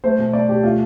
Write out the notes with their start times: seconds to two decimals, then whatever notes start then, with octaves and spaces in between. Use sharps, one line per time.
0.04 A3 C5
0.19 B2
0.33 A3 D5
0.49 B2 G4
0.63 A3 F4